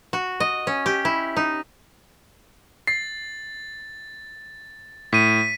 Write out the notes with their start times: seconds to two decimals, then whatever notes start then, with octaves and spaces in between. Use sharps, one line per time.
0.13 F#4
0.40 D#5
0.67 C#4
0.86 G4
1.05 E4
1.37 D#4
2.87 A6 C7
5.13 A2 B6 D#7